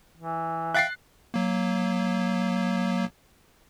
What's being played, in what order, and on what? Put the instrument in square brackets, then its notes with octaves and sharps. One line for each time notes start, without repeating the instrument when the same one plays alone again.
[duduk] E3
[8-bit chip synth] E5 F5 G5 [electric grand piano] F#6 A6 C7
[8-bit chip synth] F#3 A#3